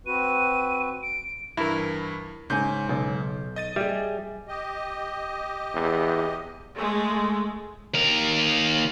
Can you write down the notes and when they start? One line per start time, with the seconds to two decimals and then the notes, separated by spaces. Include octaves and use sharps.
0.06 C4 F#4 B4 D#7
1.03 D7
1.57 G2 E3 E4 A#4
2.50 G#2 C#3 C#4 G#5 G6
2.89 B1 C#3
3.56 D#5 A6 D#7
3.76 G3 G#4 E5
4.48 G4 D#5
5.74 E2
6.74 G#3 A3
7.94 D#2 A#4